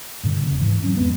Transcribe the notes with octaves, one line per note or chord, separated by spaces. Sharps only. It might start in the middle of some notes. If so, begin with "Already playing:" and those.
G2 A#2 D3
E1 C#3
G#2 E3
F#3 A3 C4 C#4
F2 G#3 B3